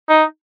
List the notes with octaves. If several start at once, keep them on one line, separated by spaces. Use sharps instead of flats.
D#4